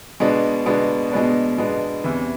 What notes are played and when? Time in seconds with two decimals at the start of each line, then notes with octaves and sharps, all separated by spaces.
0.20 B2 G#3 B3 D4
0.66 B2 G#3 B3 D4
1.12 B2 G#3 B3 D4
1.58 B2 G#3 B3 D4
2.04 E2 C3 E3